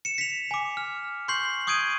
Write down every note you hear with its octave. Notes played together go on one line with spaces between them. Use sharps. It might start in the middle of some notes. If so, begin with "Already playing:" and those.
C#7 E7
B6 C#7 F7
G#5 D6
F6
C6 C#6 G6 C7 F#7
C#6 D#6 G6 G#6 D7 D#7